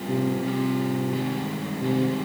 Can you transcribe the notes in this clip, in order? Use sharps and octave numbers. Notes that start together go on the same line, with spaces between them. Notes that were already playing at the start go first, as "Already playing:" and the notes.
Already playing: G3 C4 F4
C3
C3 G3 C4 F4
G2 D#3 G#3 C4
G2 C3 D#3 G#3 C4